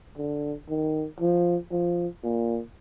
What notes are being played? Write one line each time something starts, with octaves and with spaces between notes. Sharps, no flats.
D3
D#3
F3
F3
A#2